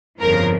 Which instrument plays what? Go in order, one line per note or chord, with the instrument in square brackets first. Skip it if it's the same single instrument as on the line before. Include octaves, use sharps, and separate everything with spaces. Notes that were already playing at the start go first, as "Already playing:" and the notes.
[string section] G1 F2 C#3 F3 A#4